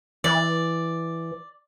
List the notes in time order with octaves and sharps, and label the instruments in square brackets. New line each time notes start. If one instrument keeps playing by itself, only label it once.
[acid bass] E3 [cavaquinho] D5